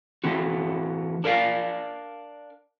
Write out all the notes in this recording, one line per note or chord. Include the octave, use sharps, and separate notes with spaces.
E3 A3 C4 F#4
D4 A#4 D5 F5